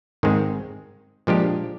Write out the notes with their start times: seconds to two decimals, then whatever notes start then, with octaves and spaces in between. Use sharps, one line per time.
0.23 G#2 D#3 G#3 C4
1.27 A#2 F3 G#3 D4 G4